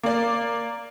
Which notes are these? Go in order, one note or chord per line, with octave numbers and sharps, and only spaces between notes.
A#3 D5